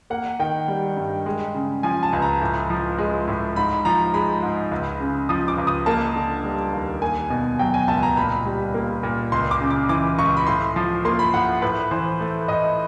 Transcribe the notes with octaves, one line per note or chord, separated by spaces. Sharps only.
A#3 F#5
D#3 G5
G3
G2
G#3
C#3
F3 G#5
A5
C#2
A#5
A2
F3
G#3
A2
G#2 B5
F3 A#5
G#3 B5
G#2
C#2
C#3
F3 D#6
D6
C#2
D#6
A#3 A5
D3
G3
D#2
A#3 G#5
B2
F#3 G5
G#5
C#2 A5
A#5
A#2 B5
G3
A#3
A#2
C#2 C6
D6
C#3
D6
E3 D6
C#2 C#6
B5
A2 C6
F3
A#3 C6
B5
A2 F#5
A2 B4
E3 C5
A3
A2 D#5